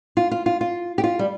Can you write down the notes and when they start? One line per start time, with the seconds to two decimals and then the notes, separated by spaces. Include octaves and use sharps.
0.17 F4
0.31 F4
0.46 F4
0.61 F4
0.98 G4
1.04 F4
1.19 G3